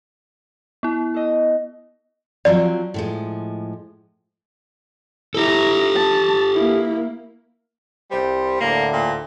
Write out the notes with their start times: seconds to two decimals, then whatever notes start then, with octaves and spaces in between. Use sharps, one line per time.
0.83 B3 E4
1.14 A4 D#5
2.45 F3 F#3 C4 D5
2.94 A2 F3 G#3
5.34 E4 G4 A4 A#5
5.95 A5
6.54 A#3 E4
8.11 C2 G3 C5
8.60 D2 A2 D3 A#3
8.93 A#2